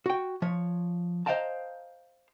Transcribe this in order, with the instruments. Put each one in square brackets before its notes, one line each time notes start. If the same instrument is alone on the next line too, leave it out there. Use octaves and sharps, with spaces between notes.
[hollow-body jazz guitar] F#4 G5
F3 C#5
C5 D#5 F5 G5 A5 A#5